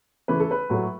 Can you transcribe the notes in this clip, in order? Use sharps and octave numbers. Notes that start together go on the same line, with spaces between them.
C#3 E3 A3 B4
A4
B4
A2 F#3 A3